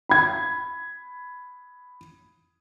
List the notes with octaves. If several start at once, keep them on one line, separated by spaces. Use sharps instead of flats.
B5 G#6